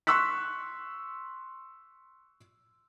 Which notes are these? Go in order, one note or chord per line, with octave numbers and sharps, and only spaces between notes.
C6 C#6 E6 F#6 B6